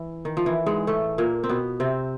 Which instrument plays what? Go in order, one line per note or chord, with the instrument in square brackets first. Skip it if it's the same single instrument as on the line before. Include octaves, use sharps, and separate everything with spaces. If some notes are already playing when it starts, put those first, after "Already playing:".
Already playing: [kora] E3
D#3
F3
E3
G#2 G#3
A2 A3
A#2 A#3
C4
B2 B3
C3 C4